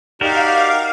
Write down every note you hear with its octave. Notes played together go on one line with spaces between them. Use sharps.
D#4 F#4 G4 A#4 D5 F5